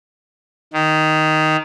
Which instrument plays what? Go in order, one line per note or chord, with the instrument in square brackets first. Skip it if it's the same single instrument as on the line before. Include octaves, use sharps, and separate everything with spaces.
[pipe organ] D#3